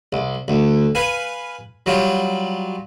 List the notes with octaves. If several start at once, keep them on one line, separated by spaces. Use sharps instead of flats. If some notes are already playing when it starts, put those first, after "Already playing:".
C2
D2
B4 F5 G#5
F#3 G3 F4